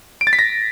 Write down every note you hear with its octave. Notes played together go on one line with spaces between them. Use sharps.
D7
A6
B6
A#6